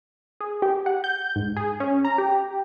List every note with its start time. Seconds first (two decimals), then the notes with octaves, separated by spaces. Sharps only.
0.40 G#4
0.62 G4
0.86 F#5
1.04 G6
1.36 G#2
1.57 G#4
1.80 C#4
2.05 A#5
2.18 G4